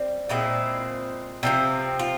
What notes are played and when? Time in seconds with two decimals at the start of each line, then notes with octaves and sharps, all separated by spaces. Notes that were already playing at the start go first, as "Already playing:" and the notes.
Already playing: G3 C4
0.29 A#2 G#3 C4 E4
1.43 C3 F3 C4
1.99 F4